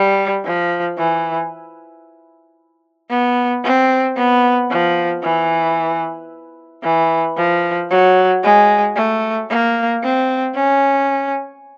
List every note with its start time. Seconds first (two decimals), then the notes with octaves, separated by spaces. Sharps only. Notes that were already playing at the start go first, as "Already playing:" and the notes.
Already playing: G3
0.45 F3
0.98 E3
3.10 B3
3.64 C4
4.17 B3
4.70 F3
5.23 E3
6.83 E3
7.37 F3
7.90 F#3
8.43 G#3
8.96 A3
9.50 A#3
10.03 C4
10.56 C#4